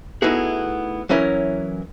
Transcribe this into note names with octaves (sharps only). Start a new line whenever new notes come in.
A3 B3 D#4 E4 F#4 G#4
E3 F#3 C#4 E4 A#4